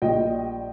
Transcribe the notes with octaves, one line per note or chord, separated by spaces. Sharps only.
A#1 A#2 G3 D#5 G5